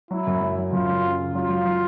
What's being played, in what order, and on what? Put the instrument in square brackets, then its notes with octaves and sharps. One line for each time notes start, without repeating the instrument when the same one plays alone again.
[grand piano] F#3 [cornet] E4
[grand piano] F#2
F#3
F#3
[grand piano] F#2 [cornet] F4
[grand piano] F#3
C#3
C#3
[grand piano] F#3 [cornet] F4
[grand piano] F#3
F#3